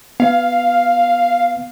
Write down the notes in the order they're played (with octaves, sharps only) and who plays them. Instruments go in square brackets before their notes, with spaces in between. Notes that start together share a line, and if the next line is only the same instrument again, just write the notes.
[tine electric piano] B3 [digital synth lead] F5